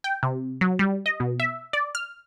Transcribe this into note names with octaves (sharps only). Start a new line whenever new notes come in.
G5
C3
F#3
G3
D#5
B2
E5
D5
F6